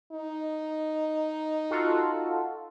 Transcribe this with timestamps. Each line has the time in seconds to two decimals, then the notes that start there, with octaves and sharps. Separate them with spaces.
0.12 D#4
1.71 F4 F#4 A4